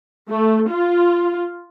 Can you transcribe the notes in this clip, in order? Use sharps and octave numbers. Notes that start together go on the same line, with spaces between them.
A3
F4